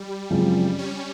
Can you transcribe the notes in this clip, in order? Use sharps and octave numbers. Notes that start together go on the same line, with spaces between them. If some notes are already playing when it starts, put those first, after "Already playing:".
Already playing: G3
F#2 C#3 F3 G#3 C4
C#4